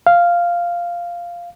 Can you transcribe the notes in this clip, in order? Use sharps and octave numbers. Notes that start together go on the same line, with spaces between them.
F5